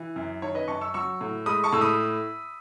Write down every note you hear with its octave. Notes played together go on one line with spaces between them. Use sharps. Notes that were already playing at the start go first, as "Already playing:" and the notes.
Already playing: E3
F#2
D#3 C#5
B4 D#5
F#2 A5 C#6
C#6 E6
F#3 C#6 E6
A2
G#3 B5 D#6
A5 C#6
A2 E6
B5 D#6